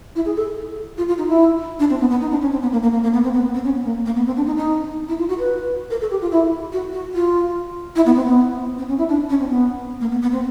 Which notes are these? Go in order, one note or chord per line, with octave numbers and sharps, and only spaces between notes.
E4
G#4
A4
F4
F4
D#4
E4
D4
C4
B3
B3
D#4
D4
C#4
C4
B3
A#3
A#3
A#3
A#3
B3
C4
B3
C4
C#4
B3
A#3
A#3
B3
C4
D4
D#4
D#4
E4
F4
F#4
B4
A#4
A4
G4
F4
E4
F#4
F#4
F4
E4
B3
C4
B3
C4
C#4
E4
D4
C#4
C4
B3
A#3
B3
B3
C4